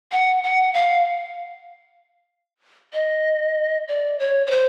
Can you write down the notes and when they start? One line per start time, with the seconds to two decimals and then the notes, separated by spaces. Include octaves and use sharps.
0.12 F#5
0.43 F#5
0.74 F5
2.93 D#5
3.88 D5
4.19 C#5
4.47 C#5
4.51 C5